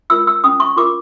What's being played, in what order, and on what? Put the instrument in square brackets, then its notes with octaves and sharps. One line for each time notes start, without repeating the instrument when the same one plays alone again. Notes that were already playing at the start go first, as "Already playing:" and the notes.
[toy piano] F4 A#4 E6
E6
C#4 D#6
C#6
F4 A#4 D6